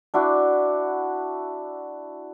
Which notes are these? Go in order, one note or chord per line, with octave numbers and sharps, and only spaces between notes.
D4 E4 F#4